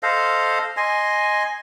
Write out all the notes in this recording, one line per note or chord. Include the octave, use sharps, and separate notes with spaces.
A4 C5 D#5 F5
D#5 G#5 C6